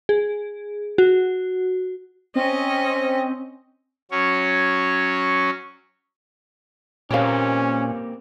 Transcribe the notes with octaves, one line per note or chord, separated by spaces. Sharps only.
G#4
F#4
C4 C#4 D#5
F#3 C#4 C#5
A#2 A#3 C4 C#4 G4 C#5 F5